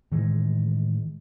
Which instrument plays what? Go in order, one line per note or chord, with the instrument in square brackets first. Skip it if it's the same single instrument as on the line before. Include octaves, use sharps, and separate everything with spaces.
[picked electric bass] A2 D#3 E3 G#3